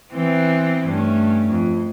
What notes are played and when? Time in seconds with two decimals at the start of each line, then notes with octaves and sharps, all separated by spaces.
0.13 E3 B3 C4
0.87 G2 A3 C#4
1.49 F2